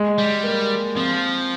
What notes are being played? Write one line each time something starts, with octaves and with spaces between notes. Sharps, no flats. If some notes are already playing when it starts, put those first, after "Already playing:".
Already playing: G#3
G3
A#3
F3 C4